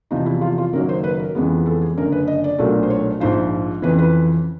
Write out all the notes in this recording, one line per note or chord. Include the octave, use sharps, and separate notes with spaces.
E2 C3 F3 D#4
E4
F4
F4
F#1 F#2 D#3 F#3 A#3 A#4
C5
B4
A#4
F2 C#3 E3 G#3 B3
A4
G#4
F#1 F#2 D3 A#4
B4
D#5
D5
B1 A#2 F#3 A3 D4
C5
C#5
A#1 G#2 F3 C5
F2 C#3 E3 B4
B4